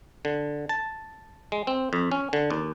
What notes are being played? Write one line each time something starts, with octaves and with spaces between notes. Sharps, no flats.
D3
A5
G#3
C4
F2
C#4
D3
D#2